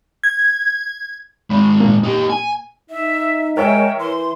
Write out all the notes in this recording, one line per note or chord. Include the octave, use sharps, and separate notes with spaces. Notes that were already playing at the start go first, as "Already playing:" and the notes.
G#6
D#3 G#3 B5
A#2 A#3
D#4 G4
G#5
D#4 E5
G#3 A#4 C#5 E5 G5
E3 C6